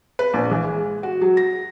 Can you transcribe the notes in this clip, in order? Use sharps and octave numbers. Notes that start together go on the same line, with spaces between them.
B4
A#1
E3
G#3
F#4
F#3
A#6